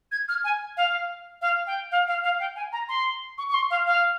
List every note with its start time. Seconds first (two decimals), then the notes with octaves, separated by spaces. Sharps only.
0.12 G#6
0.29 F6
0.44 G#5
0.77 F5
1.41 F5
1.67 G5
1.92 F5
2.08 F5
2.24 F5
2.40 G5
2.56 G#5
2.72 A#5
2.89 C6
3.38 C#6
3.49 C#6
3.54 C6
3.70 F5
3.87 F5